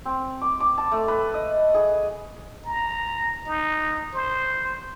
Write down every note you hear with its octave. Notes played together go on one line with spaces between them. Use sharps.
C4
D6
D6
A5
A3
B4
D#5
G#4
A#5
D#4
C5